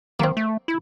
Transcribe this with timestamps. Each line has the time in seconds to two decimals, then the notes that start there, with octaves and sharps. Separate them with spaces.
0.20 D#3 A#3 C4
0.37 A3
0.68 E4